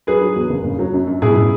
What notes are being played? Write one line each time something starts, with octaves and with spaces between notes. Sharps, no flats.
F#3 G#4 B4
F#3
E2
F#1
C#3
F#3
F#2
F#2
B2 E4 G#4
B2